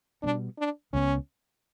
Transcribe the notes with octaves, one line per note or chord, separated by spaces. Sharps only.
B2 G3 B3 D4
D4
C#2 C#3 G3 B3 C#4